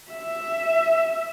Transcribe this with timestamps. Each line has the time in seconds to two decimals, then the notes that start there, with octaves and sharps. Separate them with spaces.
0.11 E5